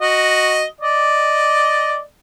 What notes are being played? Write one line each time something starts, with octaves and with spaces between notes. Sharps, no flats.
F#4 D#5
D5 D#5